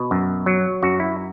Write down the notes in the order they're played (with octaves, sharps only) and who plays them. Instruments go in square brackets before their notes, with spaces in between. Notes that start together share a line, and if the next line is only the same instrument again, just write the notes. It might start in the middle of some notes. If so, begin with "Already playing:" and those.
Already playing: [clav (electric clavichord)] B2
F#2
F#3
F#2 F#4
E4